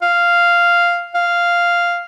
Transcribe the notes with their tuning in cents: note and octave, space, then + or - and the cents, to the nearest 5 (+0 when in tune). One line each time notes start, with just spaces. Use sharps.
F5 -5
F5 -5